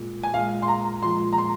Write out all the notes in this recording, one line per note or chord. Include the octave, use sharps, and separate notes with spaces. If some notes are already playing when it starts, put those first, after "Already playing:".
Already playing: A#2 G#3
G#5
A#2 G#3 F5
C6
A#5
A#2 F3 G#3 C6
A#5
C6